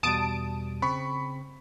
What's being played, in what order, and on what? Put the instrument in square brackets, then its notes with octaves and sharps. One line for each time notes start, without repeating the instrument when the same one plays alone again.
[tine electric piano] E2 B2 G3 [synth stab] A5 D#6 D7
[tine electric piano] C#3 C4 [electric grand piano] B5 C#6